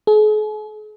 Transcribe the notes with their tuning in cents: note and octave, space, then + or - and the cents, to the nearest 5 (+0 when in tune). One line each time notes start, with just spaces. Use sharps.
G#4 +45